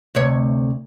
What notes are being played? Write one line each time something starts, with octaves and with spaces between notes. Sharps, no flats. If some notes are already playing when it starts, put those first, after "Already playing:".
D2 C3 C#5